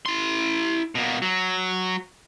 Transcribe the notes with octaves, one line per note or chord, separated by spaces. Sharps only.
E4 C6
B2 A#3
F#3